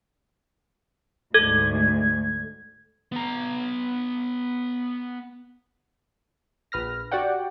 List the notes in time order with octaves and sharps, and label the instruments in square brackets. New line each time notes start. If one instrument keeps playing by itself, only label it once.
[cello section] D2 G#2 [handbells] A4 [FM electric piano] G#6
[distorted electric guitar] B3 A#5
[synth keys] A#1 B4 F6 A#6
F#4 G4 D5 F#5 G5